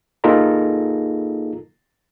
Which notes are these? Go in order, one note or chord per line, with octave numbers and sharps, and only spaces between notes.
A#3 D#4 F4 G#4 A4 A#5